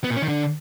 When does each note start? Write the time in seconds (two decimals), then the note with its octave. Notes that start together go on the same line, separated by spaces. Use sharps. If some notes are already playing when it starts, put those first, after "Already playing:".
0.04 B3
0.10 A#2
0.16 C#4
0.22 D#3
0.28 D3